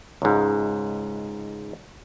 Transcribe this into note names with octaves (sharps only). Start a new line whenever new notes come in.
C#2 G#2